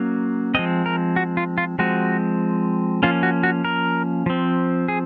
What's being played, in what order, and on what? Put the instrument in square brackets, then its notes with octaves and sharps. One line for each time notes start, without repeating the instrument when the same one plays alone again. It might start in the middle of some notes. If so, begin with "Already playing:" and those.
Already playing: [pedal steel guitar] F#3 A#3 C#4
F3 G#3 C4 D#5
A#4
F#4
F4
F4
F3 G#3 C4 F#4
F3 A#3 C#4 F4
F#4
F#4
A#4
F3 C4
G#4